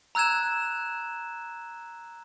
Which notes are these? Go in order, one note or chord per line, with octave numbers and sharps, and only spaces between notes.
A#5 E6 F#6 G#6 E7